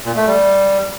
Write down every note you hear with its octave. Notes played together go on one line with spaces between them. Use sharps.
A#2
A3
G3